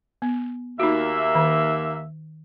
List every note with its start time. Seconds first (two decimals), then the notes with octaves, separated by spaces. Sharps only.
0.22 B3
0.80 D#2 A#3 D#4 F#4 E5
1.35 D#3